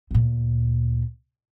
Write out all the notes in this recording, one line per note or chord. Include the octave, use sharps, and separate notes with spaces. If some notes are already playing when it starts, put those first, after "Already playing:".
D2 A#2